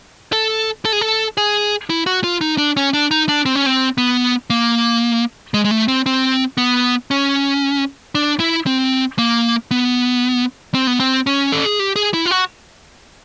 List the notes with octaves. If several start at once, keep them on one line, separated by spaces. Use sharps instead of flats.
A4
A4
G#4
A4
G#4
E4
F#4
F4
D#4
D4
C#4
D4
D#4
D4
C4
C#4
C4
B3
A#3
G#3
G#3
A3
C4
C4
B3
C#4
D4
E4
C4
A#3
B3
C4
B3
C4
C#4
A4
G#4
G4
G#4
E4
F4
F#4